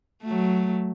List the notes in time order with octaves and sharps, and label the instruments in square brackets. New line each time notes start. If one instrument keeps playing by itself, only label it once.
[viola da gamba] F#3 A3